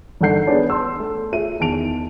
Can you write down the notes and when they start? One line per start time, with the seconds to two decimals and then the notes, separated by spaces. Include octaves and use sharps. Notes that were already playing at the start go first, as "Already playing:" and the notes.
0.21 G1 D#3 A4 F#5 G6 C7
0.47 B3 D4 G#4 C#5 D5 A5
0.70 A5 C6 E6
1.00 A3
1.32 F4 G#4 E5 D#7
1.60 E2 D#3 A5 D7 F7